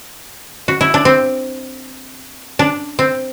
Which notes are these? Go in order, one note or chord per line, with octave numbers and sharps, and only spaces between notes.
F#4
E4
D4
C4
D4
C4